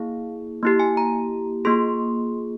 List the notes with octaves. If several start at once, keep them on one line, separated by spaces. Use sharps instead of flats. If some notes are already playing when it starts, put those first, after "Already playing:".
Already playing: A#3 E4 G#4 F5
A#3 E4 G4
G#5
A#5
A#3 F4 G#4 C6